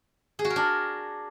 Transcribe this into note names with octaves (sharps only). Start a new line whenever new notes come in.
G#4
F#4
A#4
D4